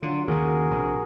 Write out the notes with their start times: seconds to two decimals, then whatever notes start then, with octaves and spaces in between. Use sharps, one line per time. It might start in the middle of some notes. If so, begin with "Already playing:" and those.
0.02 D3 F#3 F4
0.28 D#2 C#3 F#4 G#4 A#4
0.71 A#1 C3